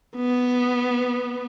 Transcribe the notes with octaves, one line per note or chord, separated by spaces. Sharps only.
B3